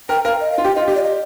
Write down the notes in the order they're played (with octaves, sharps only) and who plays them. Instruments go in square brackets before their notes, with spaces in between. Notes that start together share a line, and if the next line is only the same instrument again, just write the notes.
[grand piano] A#4 [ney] G5
[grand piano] A#4 [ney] F5
[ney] D#5
F5
[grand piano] F4
[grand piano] G4 [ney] G5
[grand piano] F4 [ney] D#5
[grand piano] G4 [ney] D#5
[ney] D5
D#5